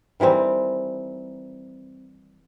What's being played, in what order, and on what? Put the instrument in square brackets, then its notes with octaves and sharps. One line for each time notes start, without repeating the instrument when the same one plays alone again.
[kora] D#3 E3 G3 C4